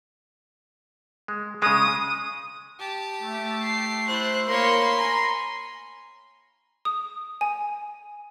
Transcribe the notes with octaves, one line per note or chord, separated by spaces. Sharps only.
G#3
C#3 G#3 D#6
G4 A5
A3
C7
E4 C5 F#6
A#3 A#4 C#5 B5 C6
G#5 A#5
D#6
G#5